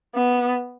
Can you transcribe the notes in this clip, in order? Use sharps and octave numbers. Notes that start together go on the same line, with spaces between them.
B3